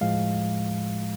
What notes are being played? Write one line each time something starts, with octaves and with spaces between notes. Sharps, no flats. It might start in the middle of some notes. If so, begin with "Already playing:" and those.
A2 F3 G#3 F5